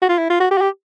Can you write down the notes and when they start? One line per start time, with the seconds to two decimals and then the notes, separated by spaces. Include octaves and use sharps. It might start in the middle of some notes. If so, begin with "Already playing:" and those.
0.02 F#4
0.09 F4
0.18 E4
0.30 F4
0.40 F#4
0.51 G4
0.58 F#4
0.61 G4